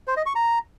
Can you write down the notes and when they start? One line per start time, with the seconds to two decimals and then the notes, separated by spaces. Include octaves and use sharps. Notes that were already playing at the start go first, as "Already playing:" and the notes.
0.08 C5
0.17 D#5
0.26 C#6
0.35 A#5